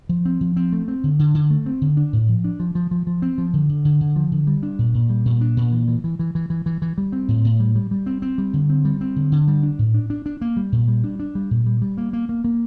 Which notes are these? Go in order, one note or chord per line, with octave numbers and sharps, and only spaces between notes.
F3
C4
F3
C4
A3
C4
D3
D3
D3
A3
C4
D3
D4
A2
F3
D4
F3
F3
F3
F3
C4
F3
D3
D3
D3
D3
F3
D3
G3
D4
A#2
A#2
G3
A#2
D4
A#2
E3
E3
E3
E3
E3
E3
E3
E3
G3
C4
A2
A2
G3
G3
G3
C4
C4
G3
D3
C4
G3
C4
D3
D3
G3
D4
A2
D4
D4
D4
A#3
G3
A#2
G3
D4
D4
G3
A#2
G3
G3
A#3
A#3
A#3
A#3